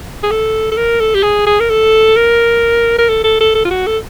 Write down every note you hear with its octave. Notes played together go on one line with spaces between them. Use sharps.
G#4
A4
A4
A#4
A4
G4
G#4
G#4
A#4
A4
A#4
A#4
A4
A4
A4
A4
F4
F#4
A4